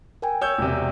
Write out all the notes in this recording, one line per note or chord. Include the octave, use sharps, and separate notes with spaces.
A#4 G5 G#5
C#5 E6 G6
E1 C3